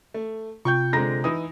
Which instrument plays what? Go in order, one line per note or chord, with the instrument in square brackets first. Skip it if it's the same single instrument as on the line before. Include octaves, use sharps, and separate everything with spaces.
[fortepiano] A3
[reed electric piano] C3 [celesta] F4 G6 [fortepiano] G5 C#6
[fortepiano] D3 G#3 C4 [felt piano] A#5 A#6
[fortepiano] E3 D#4 [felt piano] D#6